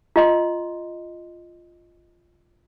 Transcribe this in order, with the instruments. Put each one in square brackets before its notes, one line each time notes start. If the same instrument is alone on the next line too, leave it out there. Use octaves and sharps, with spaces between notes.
[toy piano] F4 D#5 C6